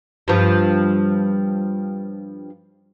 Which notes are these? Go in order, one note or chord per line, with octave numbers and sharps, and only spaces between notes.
G2 F3